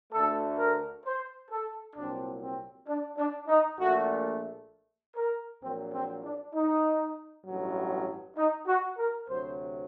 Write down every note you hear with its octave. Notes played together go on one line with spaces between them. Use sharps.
D2 D3 A3 A4
A#4
C5
A4
C2 A#2 F#3 C4 D4
C4
D4
D4
D#4
A#1 A#2 A3 F#4
A#4
A#1 A#2 F#3 A#3 C4
C4
D4
D#4
A1 G2 F#3
D#4
F#4
A#4
D2 C3 F#3 C5